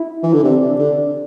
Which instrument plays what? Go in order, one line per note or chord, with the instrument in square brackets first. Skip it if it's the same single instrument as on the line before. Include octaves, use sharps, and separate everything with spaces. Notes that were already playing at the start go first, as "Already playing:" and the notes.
Already playing: [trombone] E4
[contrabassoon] E3
D3
[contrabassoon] C3 [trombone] D4
[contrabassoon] D3